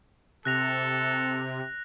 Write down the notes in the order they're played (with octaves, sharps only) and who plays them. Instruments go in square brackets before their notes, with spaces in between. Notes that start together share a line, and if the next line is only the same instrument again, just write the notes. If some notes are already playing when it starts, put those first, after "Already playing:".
[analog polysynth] C3 [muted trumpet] A4 [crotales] F#6 A#6 F7